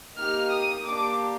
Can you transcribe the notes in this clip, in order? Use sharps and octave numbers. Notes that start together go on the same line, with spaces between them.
A#3 D#4 G4 F6
D#6
A#3 D4 G4 D6